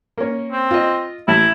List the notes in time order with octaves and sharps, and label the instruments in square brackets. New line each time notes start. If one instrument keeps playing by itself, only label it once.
[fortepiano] A#3 C#4
[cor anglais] C4
[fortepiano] F4 D#5
[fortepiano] A1 [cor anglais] E4